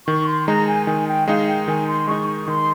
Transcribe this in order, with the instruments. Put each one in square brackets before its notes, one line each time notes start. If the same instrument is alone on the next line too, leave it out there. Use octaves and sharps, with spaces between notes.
[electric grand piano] D#3 [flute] C#6
[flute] C6
[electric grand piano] G#3 D#4 [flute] A#5
[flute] G#5
[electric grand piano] D#3 [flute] G#5
[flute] G5
[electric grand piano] G#3 D#4 [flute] F5
[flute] G5
[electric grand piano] D#3 [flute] G#5
[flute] C6
[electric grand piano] G#3 D#4 [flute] C#6
[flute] C#6
[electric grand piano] D#3 [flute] C6